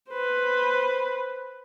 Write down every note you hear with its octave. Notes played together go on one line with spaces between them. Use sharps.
B4 C5